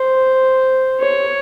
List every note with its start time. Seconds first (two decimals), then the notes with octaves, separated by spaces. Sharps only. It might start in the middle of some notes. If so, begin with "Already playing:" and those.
Already playing: C5
1.01 C#5